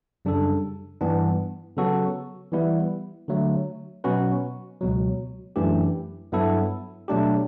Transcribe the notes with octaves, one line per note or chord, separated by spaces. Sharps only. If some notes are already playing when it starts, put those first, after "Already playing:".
F#2 C#3 G3 D4 A4
G2 E3 B3 D4
C#3 F#3 B3 F#4 A4
E3 G3 B3 E4 B4
D3 F#3 A3
B2 F#3 C#4 F#4 B4
C#2 B2 F#3
F#2 E3 A3 D4 G4
G2 F#3 B3 E4 A4
B2 F#3 A3 D4 G4